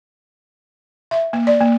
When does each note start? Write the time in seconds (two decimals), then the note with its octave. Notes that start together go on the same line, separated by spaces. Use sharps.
1.11 E5
1.33 A#3
1.47 D5
1.60 A#3